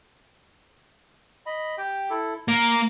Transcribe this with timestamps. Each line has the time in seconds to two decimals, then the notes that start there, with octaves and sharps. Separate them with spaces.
1.46 D#5 B5
1.78 G4 G5
2.10 E4 A4
2.48 A#3 A#5 D6